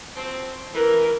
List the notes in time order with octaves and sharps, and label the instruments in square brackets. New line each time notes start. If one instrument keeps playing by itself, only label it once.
[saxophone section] F3 F#3 C4
[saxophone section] E3 [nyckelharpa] A#4